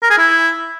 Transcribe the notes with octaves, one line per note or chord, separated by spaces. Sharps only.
A#4
G#4
E4